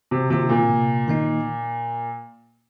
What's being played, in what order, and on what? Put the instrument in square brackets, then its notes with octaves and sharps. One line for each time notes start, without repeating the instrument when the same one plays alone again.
[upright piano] C3
[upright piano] C3 [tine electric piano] D#3 A#3 F4
[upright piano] A#2
[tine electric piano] C3
D#3 A#3 D#4